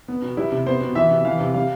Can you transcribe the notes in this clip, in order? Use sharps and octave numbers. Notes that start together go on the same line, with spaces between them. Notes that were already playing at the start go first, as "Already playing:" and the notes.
B3
B2
G3 E4
C3
B3 C5
B2
E3 E5
C3
E3 F5
C3
G3 F5